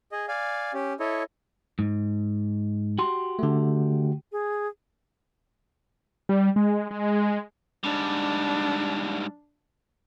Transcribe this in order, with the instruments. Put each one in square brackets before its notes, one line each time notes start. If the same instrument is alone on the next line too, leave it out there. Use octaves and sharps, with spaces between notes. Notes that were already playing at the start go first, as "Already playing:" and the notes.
[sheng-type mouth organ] G#4 D#5
D5 F5 G#5
C#4 G4
E4 A4 C#5 D#5
[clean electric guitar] G#2
F#4 G4 C6
[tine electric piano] D3 A3
[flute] G#4
[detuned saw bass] G3
G#3
G#3
[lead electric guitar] G#2 G3 [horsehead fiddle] D4